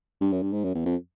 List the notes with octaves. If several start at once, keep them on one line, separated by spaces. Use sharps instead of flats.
G2
F#2
G2
G#2
F#2
E2
F2